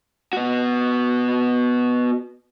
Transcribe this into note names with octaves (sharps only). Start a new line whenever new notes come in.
B3 F#4